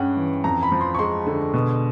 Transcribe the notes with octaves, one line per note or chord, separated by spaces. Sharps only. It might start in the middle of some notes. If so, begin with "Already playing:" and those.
Already playing: G2 G#3 C#4 F#5 G5
E3
F2 A#5
B5
F3
C6
C#6
G#3 C6
D3
B2